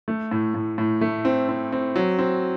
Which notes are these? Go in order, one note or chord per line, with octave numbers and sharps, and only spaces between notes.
A3
A2
A2
A2
A3
C4
C4
C4
F#3
C4